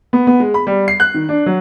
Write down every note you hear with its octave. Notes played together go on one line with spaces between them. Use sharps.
B3
B3
G#3
B5
G3
C7
F#6
D#3
D4
F#3